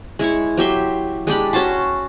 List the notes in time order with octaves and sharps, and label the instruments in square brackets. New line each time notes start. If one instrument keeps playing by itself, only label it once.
[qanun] G#3 E4 C#5 C#6
F#3 G4 E5 C6
G#3 D4 G4 B5
C#4 F#4 A5 C6